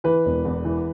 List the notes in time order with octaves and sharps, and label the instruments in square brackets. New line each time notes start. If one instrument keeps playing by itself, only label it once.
[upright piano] E3 [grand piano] B4
[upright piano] E1
E2
E3